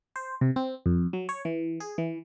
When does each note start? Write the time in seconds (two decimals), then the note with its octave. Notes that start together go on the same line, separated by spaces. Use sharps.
0.16 C5
0.41 C3
0.56 C4
0.86 F2
1.13 F#3
1.29 C#5
1.45 E3
1.80 G#4
1.98 E3